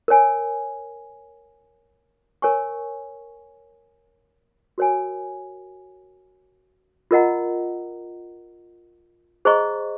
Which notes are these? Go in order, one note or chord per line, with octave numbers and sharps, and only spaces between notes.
A#4 C#5 G#5
A#4 C#5 G#5 C#6
F#4 A#4 C#5 G#5
F4 A#4 D#5 F#5 A#5
G#4 C5 D#5 A#5 C#6